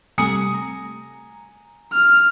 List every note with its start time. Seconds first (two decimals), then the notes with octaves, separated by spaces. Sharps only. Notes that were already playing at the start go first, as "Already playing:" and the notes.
0.18 C3 G3 A3 G#5 D#6 C#7
0.54 A#5
1.93 F6